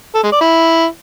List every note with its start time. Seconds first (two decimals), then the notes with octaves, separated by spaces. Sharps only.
0.15 A4
0.23 G#3
0.32 D5
0.41 E4